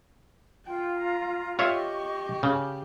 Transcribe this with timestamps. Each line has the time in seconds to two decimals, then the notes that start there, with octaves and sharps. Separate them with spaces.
0.66 F4 G5
0.98 A#5
1.59 F4 G4 C#5 D#5 E5 C#6
2.43 C#3